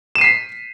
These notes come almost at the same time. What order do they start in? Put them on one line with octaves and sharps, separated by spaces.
E7 D#7 C7 B6